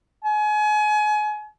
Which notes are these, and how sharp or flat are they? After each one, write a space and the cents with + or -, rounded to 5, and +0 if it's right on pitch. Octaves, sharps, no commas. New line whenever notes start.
G#5 +30